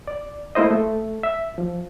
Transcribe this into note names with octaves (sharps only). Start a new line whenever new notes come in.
D5
A3 A#3 E4 C5 D#5
A3
E5
F3